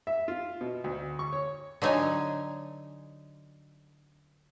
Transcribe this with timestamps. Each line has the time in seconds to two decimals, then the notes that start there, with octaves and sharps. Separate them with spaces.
0.07 E5
0.28 F4
0.61 B2
0.84 D2
1.19 C#6
1.33 C#5
1.82 D3 F#3 D#4 C#5 G#5